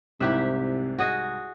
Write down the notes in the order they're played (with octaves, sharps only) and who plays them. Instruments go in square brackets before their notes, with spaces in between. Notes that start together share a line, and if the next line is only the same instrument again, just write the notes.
[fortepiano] C2 G#2 F#6 [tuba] C3 [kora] E4 G4 E5
[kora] F#4 G#4 D#5